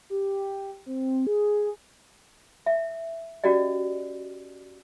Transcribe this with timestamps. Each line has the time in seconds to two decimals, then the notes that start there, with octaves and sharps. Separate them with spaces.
0.10 G4
0.86 C4
1.27 G#4
2.66 E5
3.44 C#4 F#4 G4 D5 D#5